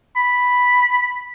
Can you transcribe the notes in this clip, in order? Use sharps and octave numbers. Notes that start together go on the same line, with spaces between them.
B5